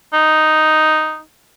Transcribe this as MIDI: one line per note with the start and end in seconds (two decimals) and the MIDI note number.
0.14 1.20 63